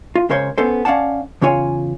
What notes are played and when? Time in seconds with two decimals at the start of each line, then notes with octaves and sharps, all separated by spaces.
0.15 F4
0.29 C#2 C#3 A#4 C5 C#5 C6
0.58 B3 C#4 A4 C5
0.85 C#4 D5 F5 F#5 A5
1.42 E2 C#3 C#4 F4 C#5 G#5